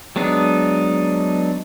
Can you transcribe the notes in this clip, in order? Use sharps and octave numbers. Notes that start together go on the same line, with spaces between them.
F#3 G#3 B3 D4 D#4